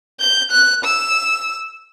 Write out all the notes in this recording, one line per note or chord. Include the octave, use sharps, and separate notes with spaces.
G6
F#6
E6